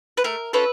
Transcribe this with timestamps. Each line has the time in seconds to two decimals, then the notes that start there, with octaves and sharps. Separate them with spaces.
0.17 B4
0.24 A3 A#4
0.53 C#4 F4 A4 B4